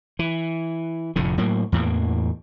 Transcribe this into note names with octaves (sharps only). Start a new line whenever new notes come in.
E3
F1 F2 A2 D3
A2 F#3 A#3
E2 A2 E3 A#3